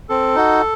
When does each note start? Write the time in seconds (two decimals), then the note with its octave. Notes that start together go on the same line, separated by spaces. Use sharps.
0.09 C4 A4
0.35 D#4 F#4